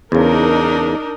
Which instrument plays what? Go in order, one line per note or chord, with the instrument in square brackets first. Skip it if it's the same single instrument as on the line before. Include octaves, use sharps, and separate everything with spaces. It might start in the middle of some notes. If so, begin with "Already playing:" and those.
[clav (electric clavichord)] E2 C#3 [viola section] D4 D#4 A#4